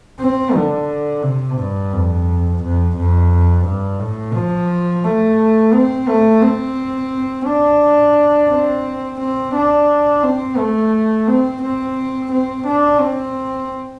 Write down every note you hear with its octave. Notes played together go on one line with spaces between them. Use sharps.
C4
D3
C3
G2
F2
F2
F2
G2
A2
F3
A3
C4
A3
C4
D4
C4
C4
D4
C4
A3
C4
C4
C4
D4
C4